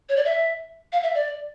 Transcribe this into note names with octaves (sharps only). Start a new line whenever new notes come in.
C#5
D5
E5
F5
E5
D5